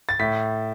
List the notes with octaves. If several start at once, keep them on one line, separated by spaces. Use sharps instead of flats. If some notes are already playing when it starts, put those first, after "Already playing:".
A6
A2 B6